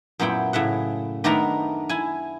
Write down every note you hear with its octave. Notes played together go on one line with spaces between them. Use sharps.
F#2 A#2 B3 E4 G5
A2 C#3 E5 F#5
D#3 A3 B3 D4 A#4 A#5
E4 G#5